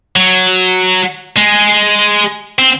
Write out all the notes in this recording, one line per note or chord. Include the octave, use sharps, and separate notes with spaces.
F#3
G#3
C4